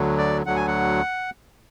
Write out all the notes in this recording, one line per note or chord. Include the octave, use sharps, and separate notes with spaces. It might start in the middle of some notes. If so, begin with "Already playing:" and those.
Already playing: D2 D3 F#3
D5
D2 D3 F#3 F#5
G#5
F#5